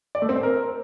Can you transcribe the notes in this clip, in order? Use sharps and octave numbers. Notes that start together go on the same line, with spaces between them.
D5
A3
C4
C5
A#4